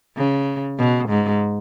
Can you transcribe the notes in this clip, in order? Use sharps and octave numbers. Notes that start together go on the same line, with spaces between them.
C#3
B2
G#2